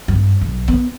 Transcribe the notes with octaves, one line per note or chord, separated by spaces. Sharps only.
G2
B1
B3